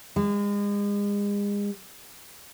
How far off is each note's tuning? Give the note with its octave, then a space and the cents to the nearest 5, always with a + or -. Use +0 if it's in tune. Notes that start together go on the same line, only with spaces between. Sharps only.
G#3 -35